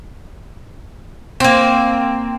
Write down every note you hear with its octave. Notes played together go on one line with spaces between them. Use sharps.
A#3 C4